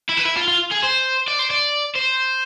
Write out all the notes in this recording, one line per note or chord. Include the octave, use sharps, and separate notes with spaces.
E4
B4
E4
F4
F4
G#4
C5
D5
C5
D5
C5